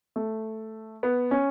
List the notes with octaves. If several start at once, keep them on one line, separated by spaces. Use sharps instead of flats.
A3
B3
C#4